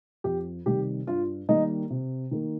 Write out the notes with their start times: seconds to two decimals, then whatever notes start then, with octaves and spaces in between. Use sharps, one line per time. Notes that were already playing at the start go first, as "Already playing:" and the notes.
0.24 F2 G4
0.66 C3 D#3 G3 G4
1.07 G2 F4
1.49 D#3 G3 A#3 D#4
1.90 C3
2.31 D#3 A#3